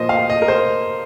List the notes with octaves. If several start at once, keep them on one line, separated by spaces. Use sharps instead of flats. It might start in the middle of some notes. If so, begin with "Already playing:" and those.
Already playing: A#2 F3 A#3 C5 D#5
F5
D#5
A#4
C5